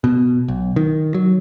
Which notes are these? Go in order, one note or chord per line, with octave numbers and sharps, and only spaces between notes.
B2
B1
D#3
F#3